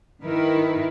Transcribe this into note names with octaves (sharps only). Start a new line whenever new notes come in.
D#3 E4 A#4 B4